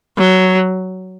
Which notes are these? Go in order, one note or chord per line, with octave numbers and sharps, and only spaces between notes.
F#3